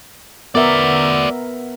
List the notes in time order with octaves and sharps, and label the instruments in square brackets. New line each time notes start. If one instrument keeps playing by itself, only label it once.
[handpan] B3 A#4 E5 [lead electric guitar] F#4 D5